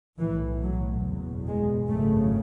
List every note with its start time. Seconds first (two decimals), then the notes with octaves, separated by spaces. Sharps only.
0.19 B1 A2 E3
0.62 F#3
1.04 F#1 E2 B2
1.47 G#3
1.89 G#1 F#2 C#3 A3